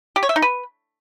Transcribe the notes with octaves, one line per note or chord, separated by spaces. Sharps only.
G4
C#5
E5
D#4
B4